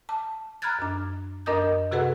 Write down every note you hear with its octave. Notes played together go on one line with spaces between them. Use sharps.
A5
A#5 B5 F6 F#6 G#6 A6
F#2 D4
F#2 D4 A#4 D#5 D#6 G6
C3 F#4 G#4 A4 B4 F#5